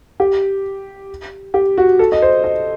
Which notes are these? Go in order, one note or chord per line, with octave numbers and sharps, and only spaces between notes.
G4
G4
F#4
A4
D#5
C5
D#5